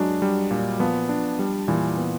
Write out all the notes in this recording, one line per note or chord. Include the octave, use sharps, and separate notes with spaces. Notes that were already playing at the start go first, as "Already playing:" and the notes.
Already playing: F#3 G#3 D4
G3
A#2
F3 B3
D4
G3
A#2 E3
B3